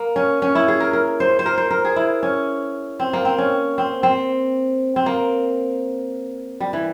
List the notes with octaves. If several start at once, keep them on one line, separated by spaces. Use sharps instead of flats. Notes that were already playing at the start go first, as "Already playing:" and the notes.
Already playing: A#3
C#4
C#4
E4
G#4
A#4
A#4
C5
C5
A#4
C5
A#4
G#4
E4
C#4
C4
A#3
C4
C#4
C4
C4
C4
A#3
G3
E3